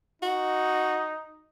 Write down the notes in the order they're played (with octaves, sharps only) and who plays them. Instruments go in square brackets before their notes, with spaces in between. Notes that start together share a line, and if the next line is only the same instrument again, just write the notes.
[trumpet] D#4 [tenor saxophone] F#4